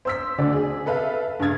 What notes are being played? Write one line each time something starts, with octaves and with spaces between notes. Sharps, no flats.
C5 E6 B6
D2 D3 D5
G#4
A4 B4 E5 F5
G2 C#3 F5 G#6 A6